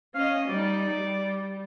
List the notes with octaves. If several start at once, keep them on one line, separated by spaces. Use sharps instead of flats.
C#4 D#5 F5
G3 D#4 D5
G3